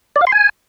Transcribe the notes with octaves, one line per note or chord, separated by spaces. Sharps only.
D5
F5
C6
G#5